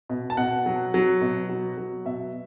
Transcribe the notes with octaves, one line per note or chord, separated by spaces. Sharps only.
B2
A5
B2 F#5
F#3
F#3
B2
F#3
F#3
B2 E5